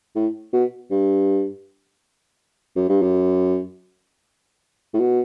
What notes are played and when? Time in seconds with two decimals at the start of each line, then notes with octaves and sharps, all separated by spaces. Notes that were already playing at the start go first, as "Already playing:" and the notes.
0.16 A2
0.53 B2
0.91 G2
2.76 F#2
2.89 G2
3.02 F#2
4.94 A2
4.99 B2